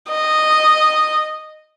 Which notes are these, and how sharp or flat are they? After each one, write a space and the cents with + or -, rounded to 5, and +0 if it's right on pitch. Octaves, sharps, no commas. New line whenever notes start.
D#5 -10